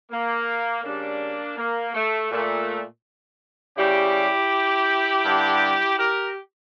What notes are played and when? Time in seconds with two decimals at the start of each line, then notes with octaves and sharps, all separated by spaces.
0.11 A#3
0.83 C#3 G3 A#3 D4
1.57 A#3
1.94 A3
2.31 A#2 A3
3.77 C#3 G3 E4 G4
5.24 G2 D3 G3
5.97 G4 A#4